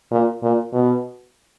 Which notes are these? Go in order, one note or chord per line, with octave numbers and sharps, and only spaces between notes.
A#2
A#2
B2